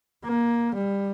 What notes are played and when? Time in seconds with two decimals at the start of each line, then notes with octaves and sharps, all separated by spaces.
0.24 A#3
0.75 G3